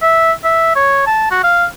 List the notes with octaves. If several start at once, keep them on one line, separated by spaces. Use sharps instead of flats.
E5
E5
C#5
A5
F#4
F5